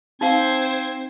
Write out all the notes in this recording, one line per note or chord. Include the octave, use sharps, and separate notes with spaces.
C4 D#4 C5 F5 G#6